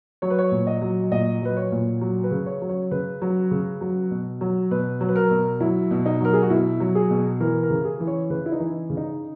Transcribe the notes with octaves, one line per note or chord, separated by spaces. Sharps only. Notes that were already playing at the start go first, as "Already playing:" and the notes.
F#3 C#5
B4
C#5
A#2
D#5
F#3
A#2 D#5
F#3 B4
C#5
A#2
F#3
B4
C#3
C#5
F#3
C#5
C#3 B4
F#3
C#3
F#3
B2
F#3
B2 B4
F#3
B4
A#4
B2
F#3 E4
B2
D#4
F#3 A#4
G#4
F#4
B2 E4
F#3
G#4
B2
E3 A#4
A#4
C#3
G#4
E3
C#5
C#3 B4
E4
D#4
E3
C#3
D#4